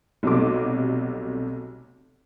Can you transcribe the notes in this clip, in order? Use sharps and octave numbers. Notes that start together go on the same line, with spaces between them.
B1 C3 F#3 G3 A3 D6